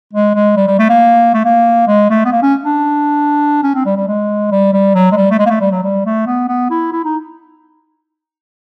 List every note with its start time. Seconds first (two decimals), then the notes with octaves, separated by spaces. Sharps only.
0.13 G#3
0.35 G#3
0.56 G3
0.67 G3
0.79 A3
0.89 A#3
1.34 A3
1.45 A#3
1.88 G#3
2.10 A3
2.25 B3
2.32 A#3
2.43 C#4
2.65 D4
3.63 C#4
3.75 C4
3.86 G3
3.97 G3
4.07 G#3
4.51 G3
4.73 G3
4.95 F#3
5.12 G#3
5.16 G3
5.31 A3
5.39 G#3
5.46 A#3
5.50 A3
5.61 G3
5.72 F#3
5.83 G3
6.05 A3
6.26 B3
6.48 B3
6.70 E4
6.92 E4
7.05 D#4